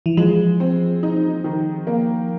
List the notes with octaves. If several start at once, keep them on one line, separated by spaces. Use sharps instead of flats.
E3
F3 G#3
C4
D#4
D#3
A#3